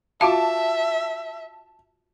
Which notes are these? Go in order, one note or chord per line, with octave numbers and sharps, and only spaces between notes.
F4 F#4 E5 F5 A5